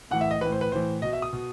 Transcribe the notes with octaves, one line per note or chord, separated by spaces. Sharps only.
A2 E3 F#5
E5
D#5
A2 E3 B4
C5
B4
A2 E3 C5
B2 D#5
E5
D#6
B2